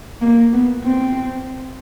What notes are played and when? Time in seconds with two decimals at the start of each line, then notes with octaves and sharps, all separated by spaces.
0.21 A#3
0.53 B3
0.83 C4